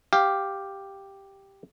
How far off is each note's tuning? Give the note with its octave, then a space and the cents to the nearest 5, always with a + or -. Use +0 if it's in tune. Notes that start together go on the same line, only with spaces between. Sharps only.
G4 +0 F5 +0